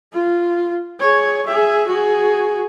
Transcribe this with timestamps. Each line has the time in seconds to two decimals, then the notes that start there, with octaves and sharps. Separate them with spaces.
0.13 F4
1.00 G#4 C#5
1.46 G#4 E5
1.88 F#4 G#4